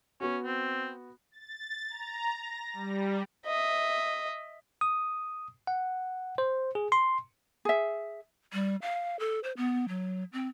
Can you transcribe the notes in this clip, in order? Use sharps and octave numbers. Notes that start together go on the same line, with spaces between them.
B3 C#4 F#4
C4
A6
A#5
A#6
G3
D#5 E5
D#6
F#5
C5
G#4
C6
G#4 E5
G3
F5
A4
C5
B3
F#3
C4